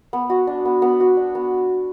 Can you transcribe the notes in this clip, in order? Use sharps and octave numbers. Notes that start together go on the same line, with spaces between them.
B3
F#4
D4
B3
B3
F#4
D4
B3